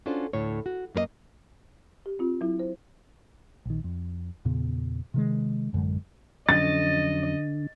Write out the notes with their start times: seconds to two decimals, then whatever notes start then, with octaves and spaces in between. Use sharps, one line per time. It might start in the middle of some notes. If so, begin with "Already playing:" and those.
0.06 C#4 D4 F4 F#4 A4 C5
0.33 D2 A2 C#5
0.66 F#4
0.95 F#2 A#3 A#4 D#5
2.06 G4
2.19 C4 F4
2.41 F#3 E4
2.59 C5
3.65 A#1 D#3
3.84 F2
4.45 E2 A#2 C#3 B3
5.14 C3 D#3 G#3
5.73 A1 F#2 D3 G#3
6.49 F2 D3 F#3 C#4 D#5 A6